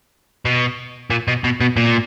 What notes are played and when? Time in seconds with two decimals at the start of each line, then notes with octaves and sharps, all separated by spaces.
0.45 B2
1.11 A#2
1.28 B2
1.44 B2
1.61 B2
1.76 A#2